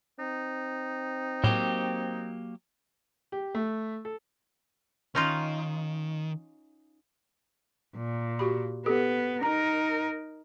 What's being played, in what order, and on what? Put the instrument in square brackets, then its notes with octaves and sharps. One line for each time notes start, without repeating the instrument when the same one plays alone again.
[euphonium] C4 [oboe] D#4
[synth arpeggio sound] A2 [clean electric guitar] F#3 A#3 G4
[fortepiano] G4
A3
A4
[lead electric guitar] D#3 [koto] C#4 D#4 F4
[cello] A#2
[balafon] F#4 G4 B5
[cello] B3 [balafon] G4 A4
[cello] D#4 A#4 [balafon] A#5